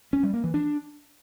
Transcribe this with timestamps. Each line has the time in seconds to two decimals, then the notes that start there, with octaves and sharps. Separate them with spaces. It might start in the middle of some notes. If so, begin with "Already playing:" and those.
0.13 C#4
0.23 G3
0.33 A#3
0.44 E3
0.54 D4